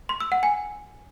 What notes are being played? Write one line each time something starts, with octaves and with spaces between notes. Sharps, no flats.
C6
E6
F#5
G#5